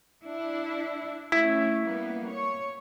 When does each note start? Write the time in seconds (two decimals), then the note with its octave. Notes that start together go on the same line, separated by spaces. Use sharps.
0.25 D4 E4
1.32 A3 C#4 E4
1.83 G3 A#3 B3
2.30 C#5